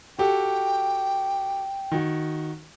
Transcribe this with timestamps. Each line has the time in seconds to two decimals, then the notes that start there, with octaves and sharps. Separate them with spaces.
0.18 F#4 G4 A4 G5
1.92 D#3 F#4